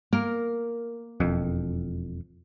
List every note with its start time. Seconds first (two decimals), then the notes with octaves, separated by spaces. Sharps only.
0.13 A#3 A#4
1.20 E1 F2